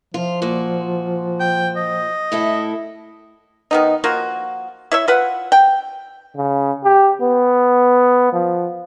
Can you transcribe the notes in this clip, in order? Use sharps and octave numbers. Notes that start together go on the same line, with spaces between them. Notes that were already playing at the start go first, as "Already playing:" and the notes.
F3 F4
A#2 F#4
G5
D#5
A2 E4 A4
D#3 B3 D#4
F3 A#3 F4 F#4
E4 C#5 E5
F4 B4 F#5
G5
C#3
G4
B3
F3